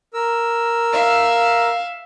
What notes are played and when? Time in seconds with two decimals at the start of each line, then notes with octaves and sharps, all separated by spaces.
0.14 A#4 E6
0.92 E5 F5